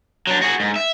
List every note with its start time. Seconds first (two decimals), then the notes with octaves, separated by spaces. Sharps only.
0.27 F#3 D4
0.42 F#4 G#4
0.60 G#2
0.76 E5